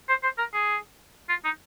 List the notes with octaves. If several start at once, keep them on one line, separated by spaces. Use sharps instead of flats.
C5
C5
A#4
G#4
F4
D#4